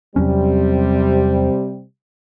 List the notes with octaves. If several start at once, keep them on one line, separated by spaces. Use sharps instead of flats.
E2 C3 F#3 G3 C4 C#4